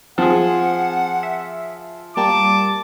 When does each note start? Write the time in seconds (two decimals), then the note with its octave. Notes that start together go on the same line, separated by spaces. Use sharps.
0.18 F3 C4 G#4 F#5
1.23 E5
2.17 G3 A#3 G4 A5 D6